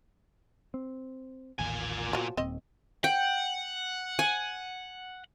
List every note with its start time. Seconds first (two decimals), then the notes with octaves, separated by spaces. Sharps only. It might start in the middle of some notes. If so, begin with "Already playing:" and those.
0.74 C4
1.59 A1 D#2 A#2 G#5
2.13 F3 F#3
2.37 D#1 D#2 C4 D#5
3.04 F#5 G5
4.19 G#5